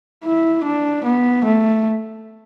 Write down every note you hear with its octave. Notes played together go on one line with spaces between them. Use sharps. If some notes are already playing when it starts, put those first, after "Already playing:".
E4
D4
B3
A3